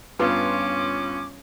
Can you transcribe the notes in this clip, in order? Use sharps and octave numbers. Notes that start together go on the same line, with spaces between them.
G2 B3 C#4 F4 D6